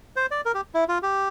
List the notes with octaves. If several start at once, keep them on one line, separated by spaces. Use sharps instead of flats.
C5
D5
A#4
G4
E4
F4
G4